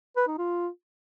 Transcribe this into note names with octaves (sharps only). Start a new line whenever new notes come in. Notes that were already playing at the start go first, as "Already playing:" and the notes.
B4
D#4
F4